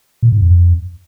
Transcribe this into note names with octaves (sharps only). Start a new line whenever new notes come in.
A#2
G#2
F2